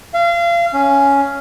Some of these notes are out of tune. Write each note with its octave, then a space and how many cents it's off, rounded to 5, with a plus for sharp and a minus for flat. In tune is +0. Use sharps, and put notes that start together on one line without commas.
F5 -30
C#4 +5